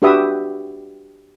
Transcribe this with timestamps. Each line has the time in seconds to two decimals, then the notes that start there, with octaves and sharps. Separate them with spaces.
0.02 D4 F#4 G4 B4 E5 D#6